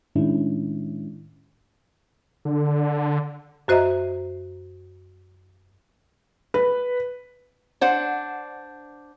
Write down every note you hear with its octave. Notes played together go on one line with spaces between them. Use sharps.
A2 D#3 G#3 C#4 D4 E4
D3
F#2 F#4 C5 D#5 E5 A#5
B4
D4 C5 F#5